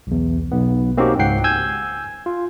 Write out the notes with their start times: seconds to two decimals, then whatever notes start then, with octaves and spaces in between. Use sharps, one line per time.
0.07 B1 E2
0.52 B1 B3
0.97 A#3 C4 C#4 D#4 F#4 G4
1.19 C#2 G#2 F#5 G5 C7
1.44 G#5 E6 G6 G#6
2.26 F4